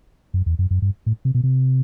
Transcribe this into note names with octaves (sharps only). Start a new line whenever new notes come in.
F#2
E2
F#2
F#2
G2
A2
C3
B2
C3